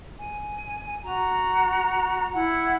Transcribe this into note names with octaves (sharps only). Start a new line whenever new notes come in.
G#5
F#4 A#5
E4 F#5